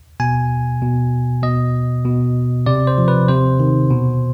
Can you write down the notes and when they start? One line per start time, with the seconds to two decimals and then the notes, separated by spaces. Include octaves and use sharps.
0.20 B2 G#5
0.82 B2
1.43 B2 D#5
2.05 B2
2.66 C3 D5
2.87 C5
2.98 F3
3.08 B4
3.28 C3 C5
3.60 D#3
3.91 B2